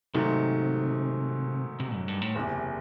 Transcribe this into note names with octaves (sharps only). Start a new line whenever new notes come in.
G#2 C3 D#3 F#3 A3
C3
F#2
G2
A2
F#1 E2 C3